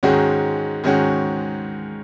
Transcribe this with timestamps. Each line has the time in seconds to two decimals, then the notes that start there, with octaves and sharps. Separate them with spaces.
0.03 G#2 D#3 G#3 C#4 F#4
0.84 G#2 D#3 G#3 C#4 F#4